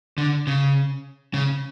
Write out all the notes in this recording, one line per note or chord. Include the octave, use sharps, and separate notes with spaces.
D3
C#3
C#3